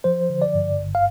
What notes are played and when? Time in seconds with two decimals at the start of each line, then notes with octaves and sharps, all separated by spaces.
0.04 F3 C5
0.30 D3
0.42 D5
0.54 G2
0.79 G1
0.95 F5